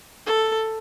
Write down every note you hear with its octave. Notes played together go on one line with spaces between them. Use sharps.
A4